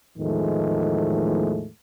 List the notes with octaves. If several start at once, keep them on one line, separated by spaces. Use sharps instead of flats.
E2 A2 D#3 F3 G#3 A3